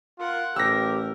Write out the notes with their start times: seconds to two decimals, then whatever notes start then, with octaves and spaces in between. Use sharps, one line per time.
0.19 F4 A#4 F#5
0.56 A1 G4 A#4 E6 A#6